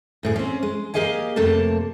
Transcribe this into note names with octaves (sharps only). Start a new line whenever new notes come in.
D2 A2 G#4
C4 C#4
G#3
A#3 G4 G#4 D#5 F5 G#5
F2 C3 A3 A#3 A5